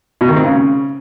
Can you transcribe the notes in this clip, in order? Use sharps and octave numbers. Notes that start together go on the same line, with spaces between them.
B2
D#3
C4
C#3